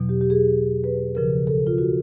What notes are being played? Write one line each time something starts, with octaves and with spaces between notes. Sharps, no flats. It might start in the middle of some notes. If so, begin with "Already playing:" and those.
Already playing: E2 B2 F#3
G4
G4
G#4
B4
D2 C#3 F3 A#4
A4
F4
F#4